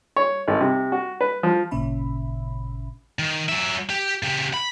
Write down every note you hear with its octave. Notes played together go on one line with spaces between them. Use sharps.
C#5
G#1
C3
F#4
B4
F3
G#1 A#2 C#3 C#4 E5 B5
D#3
F#3 E5
G4
C#3 G4
B5